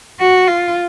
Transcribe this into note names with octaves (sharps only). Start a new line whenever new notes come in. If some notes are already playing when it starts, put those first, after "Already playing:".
F#4
F4